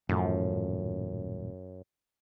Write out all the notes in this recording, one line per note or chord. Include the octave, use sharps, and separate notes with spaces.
D#1 F#2 A2 F3